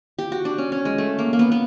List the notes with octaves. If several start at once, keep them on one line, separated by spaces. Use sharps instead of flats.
G4
F#4
D4
C#4
C#4
G#3
A3
A#3
A#3
B3
B3